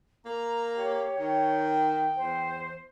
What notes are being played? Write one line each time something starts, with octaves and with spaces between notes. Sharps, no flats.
A#3 A#5
G4 C#5
D#3 G5
E2 C5